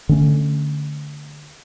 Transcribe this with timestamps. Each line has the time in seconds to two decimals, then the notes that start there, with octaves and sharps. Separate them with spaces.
0.09 D3 A3 C#4